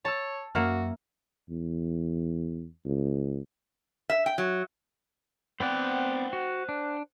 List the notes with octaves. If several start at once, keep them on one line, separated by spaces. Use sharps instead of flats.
C#5 A5 E6
F#2 A#3 F#4 E5 F6
E2
C#2
E5
G5
F#3
B3 C4 C5 D5 F#5 G5
F#4
D4